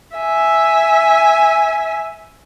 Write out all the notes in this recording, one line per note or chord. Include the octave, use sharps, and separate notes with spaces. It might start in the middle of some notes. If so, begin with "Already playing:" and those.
E5 G#5